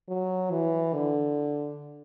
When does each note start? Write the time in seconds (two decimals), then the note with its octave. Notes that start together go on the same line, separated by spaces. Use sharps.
0.09 F#3
0.51 E3
0.93 D3